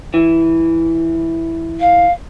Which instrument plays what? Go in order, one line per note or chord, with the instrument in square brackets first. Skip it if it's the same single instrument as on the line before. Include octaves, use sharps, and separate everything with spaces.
[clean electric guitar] E3
[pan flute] F5